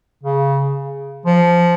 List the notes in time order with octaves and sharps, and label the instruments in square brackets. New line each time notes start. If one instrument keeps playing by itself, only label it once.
[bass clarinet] C#3
F3